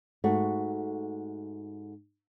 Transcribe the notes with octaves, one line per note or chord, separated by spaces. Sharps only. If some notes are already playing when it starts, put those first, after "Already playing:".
G#2 A3 F#4